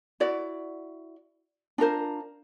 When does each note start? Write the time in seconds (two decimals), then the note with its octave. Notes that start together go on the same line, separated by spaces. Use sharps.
0.20 E4 F#4 D5
1.78 D4 F4 A#4 C5